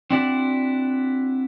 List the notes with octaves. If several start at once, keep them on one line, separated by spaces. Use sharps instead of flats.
C4 D4 E4 F#4 D5